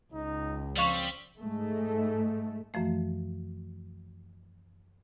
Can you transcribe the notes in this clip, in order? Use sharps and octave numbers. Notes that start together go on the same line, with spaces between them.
C#2 D#4
F3 G3 C4 F5 C#6
G#2 G#3 A3
F#2 E3 F3 A3